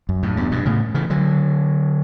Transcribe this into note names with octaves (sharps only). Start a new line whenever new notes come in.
F#2
F#2 A2
E2 G2
G2 B2
A2 C#3
C#3 E3
D3 F#3